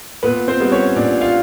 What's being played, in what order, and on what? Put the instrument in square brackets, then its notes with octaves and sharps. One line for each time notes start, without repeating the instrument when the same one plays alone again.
[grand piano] A#2 B3 B4
C4 C5
G3 B3
C#4 C#5
A#2 D4 D5
F4 F5